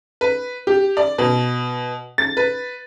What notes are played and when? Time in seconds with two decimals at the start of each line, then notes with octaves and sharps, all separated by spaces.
0.21 B4
0.67 G4
0.97 D5
1.18 B2
2.18 A6
2.37 B4